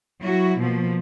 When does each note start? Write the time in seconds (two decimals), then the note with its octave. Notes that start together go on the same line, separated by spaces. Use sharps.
0.22 F#3 E4 F#4
0.59 B2 F3 A#3